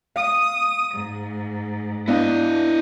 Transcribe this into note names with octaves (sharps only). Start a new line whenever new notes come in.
F5 D#6
G#2
B3 D4 E4 D#5 F5